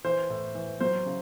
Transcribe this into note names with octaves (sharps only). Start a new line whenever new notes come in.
E3 C5
A2
E3
F#3 C5
C#3